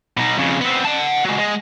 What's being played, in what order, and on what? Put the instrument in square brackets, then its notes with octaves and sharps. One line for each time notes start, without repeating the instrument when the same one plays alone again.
[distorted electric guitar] B2 D#4
F2 C#3
B3 C4
F#5 A5
F#3 G#3
G#3